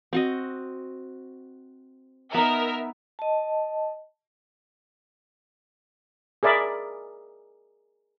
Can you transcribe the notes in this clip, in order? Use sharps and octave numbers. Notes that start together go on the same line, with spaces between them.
C4 F#4 D#5
B3 D#4 A#4 E5 F6
D#5 A5
G#4 A#4 D5 E5 B5